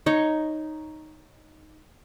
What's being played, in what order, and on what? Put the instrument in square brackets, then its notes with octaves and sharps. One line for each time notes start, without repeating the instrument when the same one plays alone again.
[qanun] D#4 C#5